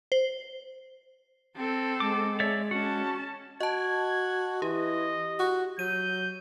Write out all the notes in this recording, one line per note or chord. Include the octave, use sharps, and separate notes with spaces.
C5
C4 A4
G#3 D6
C#5 D5 E5
C#4 F#4 A5
F#4 D#5 A5 G#6
E3 G4 D#5
F#4
F#3 G6 D#7